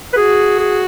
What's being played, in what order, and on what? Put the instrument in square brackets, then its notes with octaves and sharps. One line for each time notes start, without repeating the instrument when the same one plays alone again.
[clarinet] B4
[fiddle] F#4 [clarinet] G#4
[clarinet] G#4